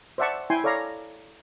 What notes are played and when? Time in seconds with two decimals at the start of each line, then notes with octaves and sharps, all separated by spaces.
0.18 C5 D5 E5 F#5 A5 C#6
0.50 E4 G5 G#5 C6
0.64 A4 C#5 D5 F5 A#5